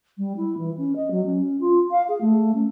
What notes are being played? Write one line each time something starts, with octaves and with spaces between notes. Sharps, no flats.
G3
E4
E3
C#4
D#5
F#3
C#4
F4
F5
G#4
A3
C#4